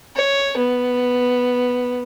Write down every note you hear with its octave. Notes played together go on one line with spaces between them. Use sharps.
C#5
B3